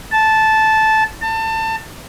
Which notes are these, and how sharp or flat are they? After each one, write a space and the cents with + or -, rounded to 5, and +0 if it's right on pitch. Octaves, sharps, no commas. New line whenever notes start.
A5 -10
A5 +25